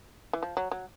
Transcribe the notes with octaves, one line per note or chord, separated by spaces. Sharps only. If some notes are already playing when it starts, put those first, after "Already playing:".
E3
F3
F#3
F#3